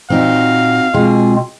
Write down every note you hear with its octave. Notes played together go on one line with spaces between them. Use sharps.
A#2 C4 D#4 F#4 F5
B2 G#3 C4 F4 G#4